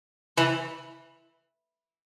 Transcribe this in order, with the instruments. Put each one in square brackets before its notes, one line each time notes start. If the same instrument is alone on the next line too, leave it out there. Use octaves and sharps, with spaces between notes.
[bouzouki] E3